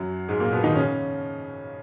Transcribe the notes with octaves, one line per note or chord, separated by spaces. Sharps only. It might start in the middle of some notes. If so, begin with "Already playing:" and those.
Already playing: F#2 F#3
G#2 G#3
A#2 A#3
B2 B3
D#3 D#4
C#3 C#4